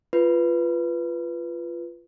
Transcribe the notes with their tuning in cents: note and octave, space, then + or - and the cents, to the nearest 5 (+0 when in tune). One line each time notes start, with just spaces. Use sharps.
F4 -15 B4 +0